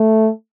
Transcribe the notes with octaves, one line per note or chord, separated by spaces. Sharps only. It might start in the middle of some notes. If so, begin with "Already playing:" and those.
Already playing: A3